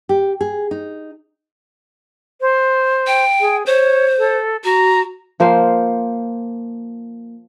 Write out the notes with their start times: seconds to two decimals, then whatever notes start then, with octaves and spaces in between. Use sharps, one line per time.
0.09 G4
0.41 G#4
0.71 D#4
2.41 C5
3.07 G5
3.41 G#4
3.66 C5 C#5
4.18 A4
4.64 F#4 A#5
5.40 F3 A#3 C5 F5